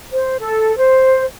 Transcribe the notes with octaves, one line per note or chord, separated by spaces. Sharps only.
C5
A4
C5